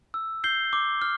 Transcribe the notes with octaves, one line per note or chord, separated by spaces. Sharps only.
E6
G6 C7 G7
D6
F6